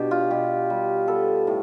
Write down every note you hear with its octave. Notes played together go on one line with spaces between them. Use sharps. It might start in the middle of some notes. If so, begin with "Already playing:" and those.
Already playing: B2 D4 G4
F4
B2 G4
G3
B3 A4
A2